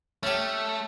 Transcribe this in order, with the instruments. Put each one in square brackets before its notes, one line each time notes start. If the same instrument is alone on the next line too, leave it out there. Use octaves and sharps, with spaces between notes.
[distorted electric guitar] A3 [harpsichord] C#4 G4